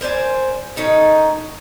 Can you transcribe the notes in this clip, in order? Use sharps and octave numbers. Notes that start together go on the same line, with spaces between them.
A#4 C5 D5 G#5
D#3 C#4 D#4 A4